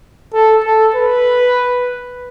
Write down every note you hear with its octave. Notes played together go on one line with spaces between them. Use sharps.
A4
A4
B4